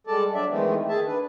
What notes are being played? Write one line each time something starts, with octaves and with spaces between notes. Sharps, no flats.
G3 G#3 A4 D5 A5
F#3 D4 D5 E5
D#3 E3 G#3 A3 B3 C4
D#3 G#4 E5 A5
D4 B4